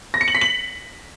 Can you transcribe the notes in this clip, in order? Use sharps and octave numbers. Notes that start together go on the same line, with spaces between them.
A#6
C#7
F#7
B6
F#7